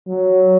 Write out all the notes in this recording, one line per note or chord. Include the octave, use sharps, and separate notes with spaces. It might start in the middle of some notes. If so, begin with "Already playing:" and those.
F#3